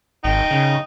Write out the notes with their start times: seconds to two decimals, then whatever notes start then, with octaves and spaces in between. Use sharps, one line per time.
0.24 G#1 D#4 G5
0.51 C#3